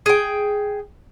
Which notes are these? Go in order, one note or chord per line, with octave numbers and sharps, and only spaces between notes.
G#4 G5